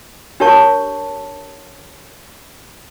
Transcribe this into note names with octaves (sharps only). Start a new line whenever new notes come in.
D4 G4 A#4 C#5 A5 C#6